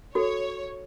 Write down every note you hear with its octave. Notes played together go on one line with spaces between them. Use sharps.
F#4 A4 C#5